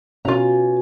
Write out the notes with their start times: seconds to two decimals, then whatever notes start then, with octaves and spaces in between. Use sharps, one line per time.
0.25 B2 C#4 F4 A#5